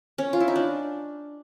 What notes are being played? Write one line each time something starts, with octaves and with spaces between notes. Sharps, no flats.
C#4
F4
E4
D#4
D4